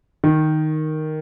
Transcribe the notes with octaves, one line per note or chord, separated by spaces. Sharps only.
D#3